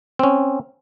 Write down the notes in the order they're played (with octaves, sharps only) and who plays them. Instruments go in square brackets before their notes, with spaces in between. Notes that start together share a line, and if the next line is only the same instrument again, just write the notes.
[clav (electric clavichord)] C4 C#4